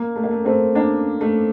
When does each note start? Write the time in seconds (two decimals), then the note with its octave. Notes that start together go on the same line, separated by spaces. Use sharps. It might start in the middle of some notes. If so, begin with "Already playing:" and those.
Already playing: A#3
0.16 A3
0.23 A#3
0.31 A3
0.45 A3 C4
0.75 A#3 D4
1.21 A3